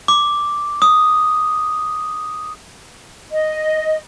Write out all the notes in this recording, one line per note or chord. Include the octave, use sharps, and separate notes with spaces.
D6
D#6
D#5